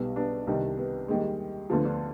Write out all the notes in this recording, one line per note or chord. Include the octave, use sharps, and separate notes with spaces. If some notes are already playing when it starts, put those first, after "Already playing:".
Already playing: B1 B2 G3 B3
B3 D4
C2 C3 D#3 G3
B3
D#2 D#3 G3 G#3
D2 D3 F3 B3
D4 F4